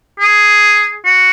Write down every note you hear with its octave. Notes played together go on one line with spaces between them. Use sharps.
G#4
F#4